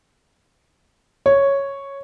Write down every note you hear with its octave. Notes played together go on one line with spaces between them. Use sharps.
C#5